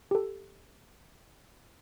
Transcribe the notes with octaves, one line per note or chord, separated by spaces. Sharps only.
G4 A4